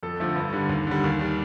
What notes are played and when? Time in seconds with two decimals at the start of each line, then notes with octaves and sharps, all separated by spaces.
0.03 F2 A4
0.20 D3 F3 A3
0.36 G2
0.53 D3 G3
0.69 D#2
0.87 D3 G3
1.04 D#2
1.19 D#3 G3